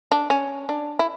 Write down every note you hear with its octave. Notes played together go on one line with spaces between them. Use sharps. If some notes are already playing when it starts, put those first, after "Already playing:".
D4
C#4
D4
E4